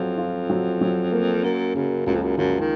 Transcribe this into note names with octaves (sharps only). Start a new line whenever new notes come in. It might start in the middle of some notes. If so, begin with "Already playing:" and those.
Already playing: F2 F#3 F4
F4
F#3
F#3
A#3
F#2 A#3
F#2 C#3
C#2 F#2
F2
F#2
F#2 F3
D#3